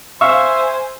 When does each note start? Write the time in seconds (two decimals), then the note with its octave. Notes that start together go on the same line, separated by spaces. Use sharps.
0.21 C5 E5 F5 G#5 C#6